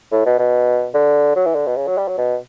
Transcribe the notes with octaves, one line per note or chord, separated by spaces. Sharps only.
A2
B2
B2
D3
F#3
E3
D3
B2
C#3
F#3
G3
F#3
B2